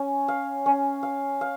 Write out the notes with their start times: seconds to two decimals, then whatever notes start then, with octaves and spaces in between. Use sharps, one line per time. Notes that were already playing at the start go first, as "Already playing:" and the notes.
Already playing: C#4
0.28 F5
0.66 C#4
1.03 F5
1.41 F5